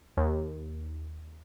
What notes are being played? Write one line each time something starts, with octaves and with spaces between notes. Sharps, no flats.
D#2